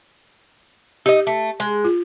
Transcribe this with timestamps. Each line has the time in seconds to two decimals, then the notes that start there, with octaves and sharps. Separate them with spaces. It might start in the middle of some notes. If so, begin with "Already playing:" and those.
1.06 D#4 G4 D#5
1.27 A3
1.60 G#3
1.85 F4